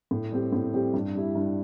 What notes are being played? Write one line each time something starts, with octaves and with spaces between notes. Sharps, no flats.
A2
G3 C4 G4
A2
G3 C4 G4
G2
G3 E4
G2